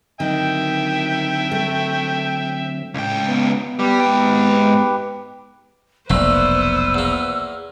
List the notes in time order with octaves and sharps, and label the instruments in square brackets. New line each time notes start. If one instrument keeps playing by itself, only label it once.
[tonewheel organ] D3 F#3 C4 [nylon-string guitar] D#3 [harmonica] E5 G5
[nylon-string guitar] A3
[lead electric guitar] C#2 G5 [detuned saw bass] A2
[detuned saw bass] B3
[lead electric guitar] G3 [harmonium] G4 B4
[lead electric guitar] G#2 G5
[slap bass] F1 B1 [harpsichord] A#2 A3 [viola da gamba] B3 B4 C5 [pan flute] E6
[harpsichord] E2 A#3